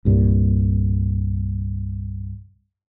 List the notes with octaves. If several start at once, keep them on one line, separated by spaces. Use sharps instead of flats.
C2 G2 A#2